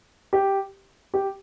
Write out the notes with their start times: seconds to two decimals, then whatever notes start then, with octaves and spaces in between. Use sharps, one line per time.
0.33 G4
1.14 G4